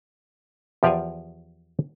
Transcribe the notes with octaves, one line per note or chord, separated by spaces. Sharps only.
E2 F3 G4 D5 F5 G#5